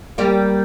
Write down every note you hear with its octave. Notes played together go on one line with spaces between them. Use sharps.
G3 A#3